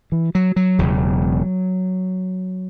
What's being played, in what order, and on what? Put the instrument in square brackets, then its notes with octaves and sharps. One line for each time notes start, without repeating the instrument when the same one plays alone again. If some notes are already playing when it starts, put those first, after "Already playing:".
[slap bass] E3
F#3
F#3
E1 E2 C#3